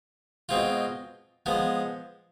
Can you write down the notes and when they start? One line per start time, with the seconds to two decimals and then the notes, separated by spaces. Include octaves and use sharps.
0.49 B2 G#3 C4 F4
1.46 F3 G#3 B3